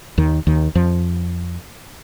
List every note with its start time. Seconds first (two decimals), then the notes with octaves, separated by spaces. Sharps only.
0.18 D#2 D#3
0.47 D#2 D#3
0.75 F2 F3